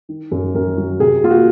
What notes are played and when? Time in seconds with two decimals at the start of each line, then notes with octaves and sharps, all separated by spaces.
0.09 D#3
0.31 F#2
0.55 F#2 A#4
0.77 F#3
1.00 C3 G#4
1.23 A#3 F4
1.30 F#4